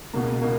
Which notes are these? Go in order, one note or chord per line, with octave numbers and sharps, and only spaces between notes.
C#2 B2 A#3
B2 A#3